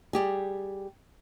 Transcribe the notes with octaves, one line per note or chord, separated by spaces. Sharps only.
G3 G4 G#4